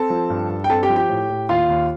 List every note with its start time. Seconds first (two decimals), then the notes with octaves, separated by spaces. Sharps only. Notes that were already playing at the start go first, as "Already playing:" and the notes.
Already playing: C4 A4 A5
0.10 F3
0.30 G2
0.49 G2
0.64 G5
0.70 C4 A4 A5
0.83 G4 G5
0.90 F3
0.96 G4 G5
1.09 A2
1.30 A2
1.49 D#2 F4 F5
1.69 D#2